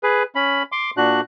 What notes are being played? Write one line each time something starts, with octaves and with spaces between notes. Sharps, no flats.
G#4 B4
C#4 B5
C6 D6
A#2 D4 F#4 F#6